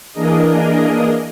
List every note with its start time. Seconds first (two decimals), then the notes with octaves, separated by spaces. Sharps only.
0.13 E3 A#3 D4 G#4 A#4 D#5